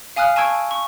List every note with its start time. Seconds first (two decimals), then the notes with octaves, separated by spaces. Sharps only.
0.16 F5 G#5 D#6 F6 F#6
0.36 G#5 A5 C#6 E6 G#6 D7
0.71 C#6